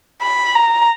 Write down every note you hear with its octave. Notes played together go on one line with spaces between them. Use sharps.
B5
A#5